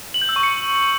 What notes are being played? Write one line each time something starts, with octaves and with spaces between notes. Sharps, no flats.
F#7
G6
E6
C#6
C#7